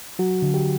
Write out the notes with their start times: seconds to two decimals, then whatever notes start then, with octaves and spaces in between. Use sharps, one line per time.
0.19 F#3 F#4
0.42 D3
0.54 G4